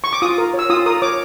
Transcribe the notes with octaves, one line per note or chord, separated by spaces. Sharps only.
C#6
D6
F4 D#6
A#4
C#5
E6
F4 D#6
A#4 D#6
C#5 D6